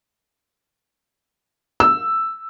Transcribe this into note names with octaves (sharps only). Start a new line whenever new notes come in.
E6